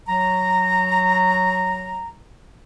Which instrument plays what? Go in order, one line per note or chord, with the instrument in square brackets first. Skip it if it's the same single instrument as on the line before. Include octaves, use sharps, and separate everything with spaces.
[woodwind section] F#3 A#5